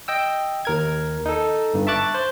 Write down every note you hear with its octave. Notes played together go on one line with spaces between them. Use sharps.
D#5 G5 E6
D#2 A#4 G#6
D#4 A4
G1 G2
E5 A5 C#6 D6 F#6 A6
C5